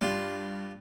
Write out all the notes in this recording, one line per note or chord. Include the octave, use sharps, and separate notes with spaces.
G2 D4 F4 G4